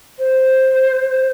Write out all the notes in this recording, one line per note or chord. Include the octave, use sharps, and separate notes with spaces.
C5